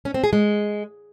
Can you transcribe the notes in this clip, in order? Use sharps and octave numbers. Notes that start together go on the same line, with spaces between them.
C#4
C4
G#4
G#3